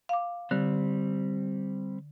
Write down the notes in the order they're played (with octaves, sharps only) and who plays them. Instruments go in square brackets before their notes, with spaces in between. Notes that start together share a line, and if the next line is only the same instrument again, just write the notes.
[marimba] F5 D6
[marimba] D3 [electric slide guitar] G3 C4